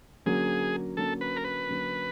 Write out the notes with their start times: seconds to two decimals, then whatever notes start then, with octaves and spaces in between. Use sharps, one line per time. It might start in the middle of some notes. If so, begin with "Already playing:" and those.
0.26 D3 F#3 A#3 C#4 G#4
0.97 D3 F#3 A#3 C#4 A4
1.21 B4
1.36 A#4
1.44 B4
1.68 D3 F#3 A#3 C#4